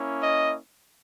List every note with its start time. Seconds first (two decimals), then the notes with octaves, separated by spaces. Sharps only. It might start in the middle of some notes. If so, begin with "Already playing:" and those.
Already playing: A#3 C#4 E4
0.20 D#5